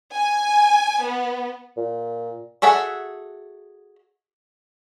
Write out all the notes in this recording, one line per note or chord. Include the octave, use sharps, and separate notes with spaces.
G#5
B3
A#2
F#4 G#4 A4 E5 F#5